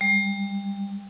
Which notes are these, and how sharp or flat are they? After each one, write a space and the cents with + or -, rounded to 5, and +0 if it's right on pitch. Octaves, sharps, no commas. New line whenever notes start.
G3 +25